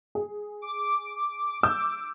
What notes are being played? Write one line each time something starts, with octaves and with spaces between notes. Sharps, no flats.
G#4
D6
E6 G6